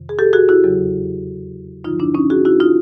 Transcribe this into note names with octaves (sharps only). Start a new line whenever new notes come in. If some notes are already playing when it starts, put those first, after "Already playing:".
Already playing: F2 C3 D#3
G#4
G4 A4
F#4 G#4
E4 F#4
E2 C#3 F#3
G2 D3 F3 D#4 F4
D4 E4
C#4 D#4
F#4 G#4
E4 F#4
D#4 F4